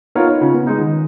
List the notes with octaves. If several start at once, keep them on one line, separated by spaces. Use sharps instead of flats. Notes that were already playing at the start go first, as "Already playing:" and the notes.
B3 D#4 F4 A#4 C#5
C#3 F4
B3
G#3 D#4
D#3